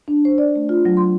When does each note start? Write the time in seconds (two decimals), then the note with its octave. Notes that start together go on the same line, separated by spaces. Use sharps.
0.08 D4
0.25 C5
0.38 D5
0.56 A3
0.69 F4
0.85 F#3
0.97 C6